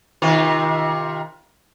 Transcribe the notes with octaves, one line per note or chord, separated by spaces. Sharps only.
C3 D#3 F4